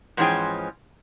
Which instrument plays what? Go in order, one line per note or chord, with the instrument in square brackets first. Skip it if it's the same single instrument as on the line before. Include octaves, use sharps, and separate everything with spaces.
[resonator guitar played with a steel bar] G#2 E3 F3 C#4 G#4 G5